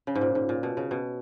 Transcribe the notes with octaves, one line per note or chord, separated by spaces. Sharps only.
C#3
G#2
A#2
G#2
A#2
B2
C#3
B2